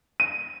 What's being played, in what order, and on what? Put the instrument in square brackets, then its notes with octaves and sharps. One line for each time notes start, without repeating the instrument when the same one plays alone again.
[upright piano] D#7